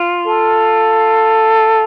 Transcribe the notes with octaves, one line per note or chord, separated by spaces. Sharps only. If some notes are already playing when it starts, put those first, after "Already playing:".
Already playing: F4
A4